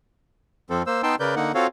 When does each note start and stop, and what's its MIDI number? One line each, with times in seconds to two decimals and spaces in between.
0.70 0.83 41
0.70 0.83 53
0.70 0.83 60
0.70 0.83 69
0.87 1.02 58
0.87 1.02 72
0.87 1.02 88
1.03 1.16 59
1.03 1.16 63
1.03 1.16 79
1.03 1.16 81
1.03 1.16 84
1.03 1.16 88
1.20 1.35 49
1.20 1.35 70
1.20 1.35 71
1.20 1.35 74
1.20 1.35 91
1.36 1.52 50
1.36 1.52 58
1.36 1.52 63
1.36 1.52 78
1.55 1.67 60
1.55 1.67 65
1.55 1.67 66
1.55 1.67 69
1.55 1.67 73
1.55 1.67 77